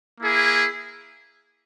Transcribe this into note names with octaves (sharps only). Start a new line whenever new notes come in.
A#3 E4 G#4